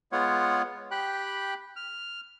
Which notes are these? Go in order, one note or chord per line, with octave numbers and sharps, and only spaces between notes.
G#3 B3 F4 C#5 F#5
G4 G5 B5 F#6
F6